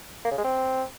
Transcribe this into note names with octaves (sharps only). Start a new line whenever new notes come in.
A#3
C#3
G#3
C4